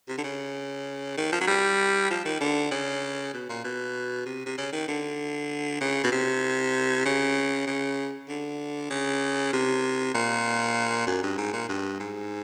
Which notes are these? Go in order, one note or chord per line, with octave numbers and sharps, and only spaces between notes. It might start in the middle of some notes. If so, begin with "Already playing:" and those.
C3
D3
C#3
D#3
F3
F#3
G3
F3
D#3
D3
C#3
B2
A#2
B2
C3
C3
C#3
D#3
D3
C#3
B2
C3
C#3
C#3
D3
C#3
C3
A#2
F#2
G2
G#2
A#2
G2
G#2